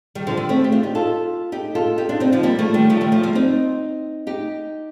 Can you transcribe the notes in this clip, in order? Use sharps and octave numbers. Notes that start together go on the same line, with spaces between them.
D#3 G3
D3 F3
D#3
A3 C4
G4
D4 F4
D#4 G4
F4 A4
D#4 G4
F4 A4
D#4 G4
D4 F4
C4 D#4
D3 F3
G3 A#3
F3 A3
D#3 G3
F3 A3
D#3 G3
F3 A3
G3 A#3
C4 D#4
D#4 G4